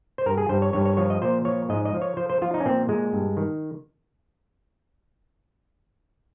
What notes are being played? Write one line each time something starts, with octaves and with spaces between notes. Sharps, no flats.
C5
G2 A#4
G#4
G2 C5
C#5
G2 C#5
C#5
F3 C#5
D#5
A#2 C5
F3 C#5
G#2 D#5
D#5
F3
C#5
F3 C5
C5
F3 F4
D#4
C#4
A#2 C4
A#2 G#3
G2
D#3